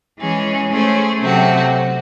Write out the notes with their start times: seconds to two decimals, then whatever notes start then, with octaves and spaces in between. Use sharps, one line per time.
0.18 E3 G#3 C#4 G#4
0.69 A3 C#4 G#4 C5
1.20 C3 F#3 A3 C4 F#4